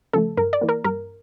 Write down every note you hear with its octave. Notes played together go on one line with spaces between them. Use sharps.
C#3 F3 A3 A4
G2 A#4
D5
E3 A#3
A#4
G2 A#4